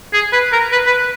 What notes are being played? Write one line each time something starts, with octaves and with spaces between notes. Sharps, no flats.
G#4
B4
A#4
B4
B4